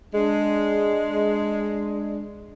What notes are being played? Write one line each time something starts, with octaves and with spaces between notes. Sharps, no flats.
G#3 D4